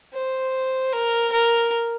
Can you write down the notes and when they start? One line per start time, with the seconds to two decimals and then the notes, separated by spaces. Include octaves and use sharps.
0.14 C5
0.93 A#4
1.32 A#4